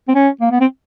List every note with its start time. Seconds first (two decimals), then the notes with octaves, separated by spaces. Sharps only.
0.08 C4
0.15 C#4
0.41 A#3
0.51 B3
0.61 C4